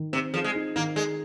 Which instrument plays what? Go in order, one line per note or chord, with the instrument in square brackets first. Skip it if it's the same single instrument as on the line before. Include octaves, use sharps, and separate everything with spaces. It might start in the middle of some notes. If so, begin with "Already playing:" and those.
Already playing: [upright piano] D#3
[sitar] C3 [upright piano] C4
[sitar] F3 [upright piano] G#4
[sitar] G#3
[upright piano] D#4
[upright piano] D#3 [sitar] A#3
[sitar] G#3 [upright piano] G#4